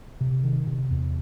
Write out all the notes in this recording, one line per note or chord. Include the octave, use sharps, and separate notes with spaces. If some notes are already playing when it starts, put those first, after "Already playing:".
C3
D#3
C3
E2